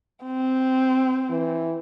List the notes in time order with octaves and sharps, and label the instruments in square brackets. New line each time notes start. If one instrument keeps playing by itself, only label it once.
[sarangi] C4
[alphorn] E3